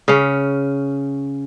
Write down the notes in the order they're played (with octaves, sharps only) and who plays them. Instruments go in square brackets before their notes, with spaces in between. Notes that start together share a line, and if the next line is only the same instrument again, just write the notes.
[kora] C#3 C#4